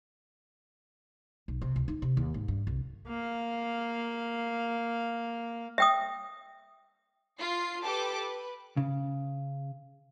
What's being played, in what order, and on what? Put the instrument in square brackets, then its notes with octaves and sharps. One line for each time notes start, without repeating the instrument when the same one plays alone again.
[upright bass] B1
C3
C#2
D#4
C3
D#2
G#2
G2
C2
[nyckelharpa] A#3 F5
[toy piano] E5 G5 D#6
[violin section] F4 C7
G4 A4 B4 G5 A5 D6
B4
[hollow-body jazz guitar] C#3